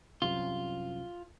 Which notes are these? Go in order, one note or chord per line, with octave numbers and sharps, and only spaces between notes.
C2 F#2 C3 F4